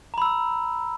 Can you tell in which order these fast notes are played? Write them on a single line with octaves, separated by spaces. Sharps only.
A#5 B5 E6